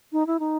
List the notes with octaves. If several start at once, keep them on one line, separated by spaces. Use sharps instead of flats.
D#4
E4
D#4